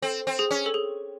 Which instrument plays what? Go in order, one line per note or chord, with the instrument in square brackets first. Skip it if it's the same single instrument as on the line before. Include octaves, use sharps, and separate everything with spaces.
[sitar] C4 [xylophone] A4
[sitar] C4
[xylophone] G#4
[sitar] C#4
[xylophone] A4
G#4